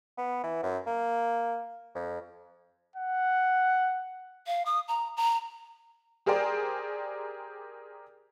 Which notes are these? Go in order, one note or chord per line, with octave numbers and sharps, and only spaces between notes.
B3
E3
F#2
A#3
F2
F#5
F5
D#6
A#5
A#5
G4 G#4 A#4 C5 D5 G5